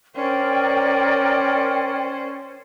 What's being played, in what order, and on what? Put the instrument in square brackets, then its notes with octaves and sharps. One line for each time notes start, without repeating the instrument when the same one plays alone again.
[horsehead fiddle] C#4 C5 [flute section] A#4 D5 G5